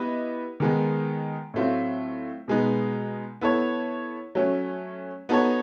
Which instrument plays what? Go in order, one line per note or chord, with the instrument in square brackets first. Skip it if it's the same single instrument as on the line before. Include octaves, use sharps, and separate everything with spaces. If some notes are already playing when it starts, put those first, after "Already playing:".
Already playing: [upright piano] B3 E4 G4 B4 D#5
D#3 G#3 B3 D#4
A2 F#3 A3 C4 F4
B2 G#3 B3 D#4
B3 E4 A4 C#5
F#3 A3 C#4
B3 D#4 F#4 A4 C#5